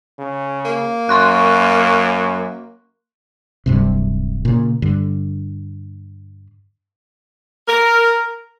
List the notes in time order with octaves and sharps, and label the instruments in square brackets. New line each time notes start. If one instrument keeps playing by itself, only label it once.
[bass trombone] C#3
[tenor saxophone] A#3
[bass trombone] F#2 [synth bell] C6 C#6 F#6
[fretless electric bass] D1 G2 C3
A#2 C#3
G2 D3
[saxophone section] A#4